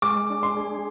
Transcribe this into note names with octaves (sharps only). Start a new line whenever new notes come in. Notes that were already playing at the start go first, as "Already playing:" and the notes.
G#3 D6
D4
C6
G#4